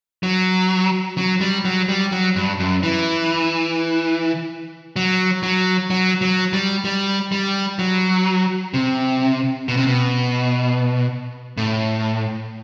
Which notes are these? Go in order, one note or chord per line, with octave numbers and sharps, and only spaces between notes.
F#3
F#3
G3
F#3
G3
F#3
G2
F#2
E3
F#3
F#3
F#3
F#3
G3
G3
G3
F#3
C3
B2
C3
B2
A2